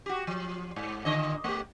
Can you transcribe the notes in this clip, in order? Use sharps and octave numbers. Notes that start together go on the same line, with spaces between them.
F#4 G4
F3
G#2
A#2 D3 D#5
A3 G4